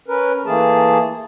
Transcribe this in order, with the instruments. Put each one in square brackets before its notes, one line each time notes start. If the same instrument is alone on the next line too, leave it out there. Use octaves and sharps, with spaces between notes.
[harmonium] C#4 A#4 B4
E3 A3 A#3 G#4 A5